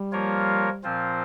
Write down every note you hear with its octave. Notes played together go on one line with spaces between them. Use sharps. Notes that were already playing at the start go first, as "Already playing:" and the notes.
Already playing: G3
F3 A#3 F4 A#4 C#5
A#2 F3 C4 F4 C5